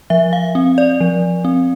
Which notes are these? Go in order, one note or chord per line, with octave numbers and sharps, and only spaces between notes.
F3 E5
F5
C4
D5
F3
C4